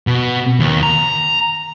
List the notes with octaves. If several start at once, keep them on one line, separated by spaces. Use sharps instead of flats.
B2
D#2
A#5